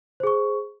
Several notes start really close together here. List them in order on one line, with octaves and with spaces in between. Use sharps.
C5 G#4 C#6